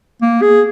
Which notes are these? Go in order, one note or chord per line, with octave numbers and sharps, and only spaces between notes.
A#3
G#4